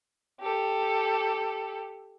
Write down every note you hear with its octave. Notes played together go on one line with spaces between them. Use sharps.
G4 A4